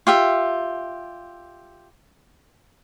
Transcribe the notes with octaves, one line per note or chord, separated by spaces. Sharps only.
F4 G4 E5